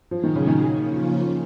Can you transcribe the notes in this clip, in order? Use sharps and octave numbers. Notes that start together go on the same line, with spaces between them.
A#2 F3 F#3 C#4 G#4
D#3
C#3
D#3
C#3 F3 A#3 C#4 F4